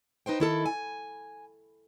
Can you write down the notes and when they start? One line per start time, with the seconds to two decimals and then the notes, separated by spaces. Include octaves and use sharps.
0.26 D#4 B4 C5 G5
0.40 D#3 E4 A4
0.66 G#5